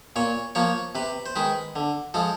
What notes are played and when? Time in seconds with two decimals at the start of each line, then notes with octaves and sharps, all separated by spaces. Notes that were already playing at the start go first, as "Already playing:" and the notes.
0.16 A#2 C#5
0.55 F3 A#3 C#5
0.95 C3 B4
1.26 C5
1.36 D#3 G#3 B4
1.76 D3
2.14 F3 G#3 A4